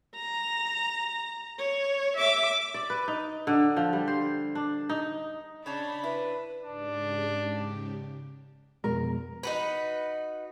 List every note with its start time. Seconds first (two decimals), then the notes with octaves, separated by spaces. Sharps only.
0.16 A#5
1.59 C#5
2.17 E5 D6
2.74 D5
2.90 B4
3.08 D#4
3.47 D3
3.77 F3
3.93 G3
4.08 C5
4.55 D4
4.89 D#4
5.66 C#3 D4 C#5 A5 B5
6.03 E4 B4
6.64 G#2 C#3 D4 G4
8.84 F2 B2 G#3 A#4
9.43 D#4 F#4 B4